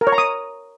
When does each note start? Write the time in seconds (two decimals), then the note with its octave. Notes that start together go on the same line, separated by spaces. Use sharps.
0.01 A#4
0.07 C#5
0.12 A#5
0.18 D#6